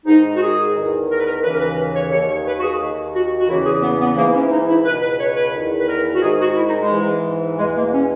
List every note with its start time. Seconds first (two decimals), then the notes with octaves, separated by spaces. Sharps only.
0.06 G#2 D#3 D#4
0.35 F#4
0.41 G#4
0.75 E2 D#3
1.09 A#4
1.17 B4
1.25 A#4
1.43 D#2 C#3 E3 B4
1.54 A#4
1.60 B4
1.94 C#5
2.12 D#2 D#3 C#5
2.28 C#5
2.46 B4
2.59 F#4
2.63 G#4
2.80 D#2 D#3
3.14 F#4
3.38 F#4
3.48 E2 C#3 E3 E4
3.65 G#4
3.82 B3
4.00 B3
4.16 G#2 E3 A#3
4.34 C#4
4.51 D#4
4.68 E4
4.85 C#2 B2 B4
5.02 B4
5.19 C#5
5.35 B4
5.53 E2 D#3
5.80 B4
5.87 A#4
6.14 F#4
6.21 G#2 D#3 G#4
6.39 F#4
6.55 E4
6.67 D#4
6.79 G#3
6.90 G#2 E3
7.58 E2 B2 G#3
7.75 A#3
7.93 C#4